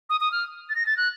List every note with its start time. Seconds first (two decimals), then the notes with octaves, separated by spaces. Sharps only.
0.10 D#6
0.21 D#6
0.32 F6
0.69 A6
0.75 A#6
0.86 A6
0.97 F#6